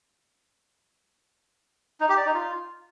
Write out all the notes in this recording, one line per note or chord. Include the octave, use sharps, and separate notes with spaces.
D#4
G4
D5
D#4
F4